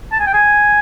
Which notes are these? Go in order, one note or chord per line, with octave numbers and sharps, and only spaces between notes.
A5
G#5
G5
G#5